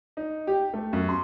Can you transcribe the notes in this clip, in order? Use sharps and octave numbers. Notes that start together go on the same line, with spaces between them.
D#4
G4
A3
F#2
C6